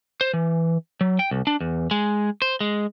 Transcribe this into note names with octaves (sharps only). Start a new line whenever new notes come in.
C5
E3
F#3
G5
C2
D4
E2
G#3
C5
G#3